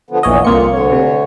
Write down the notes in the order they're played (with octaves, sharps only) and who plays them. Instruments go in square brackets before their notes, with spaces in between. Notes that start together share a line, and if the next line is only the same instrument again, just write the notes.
[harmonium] D3 F3 B3
[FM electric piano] A#1 C#5 D#5 [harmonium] E2 A#2 E3
[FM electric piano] C2 A#3 C#7 [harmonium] F2 F4
[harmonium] D2 D3 C#5
[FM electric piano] C3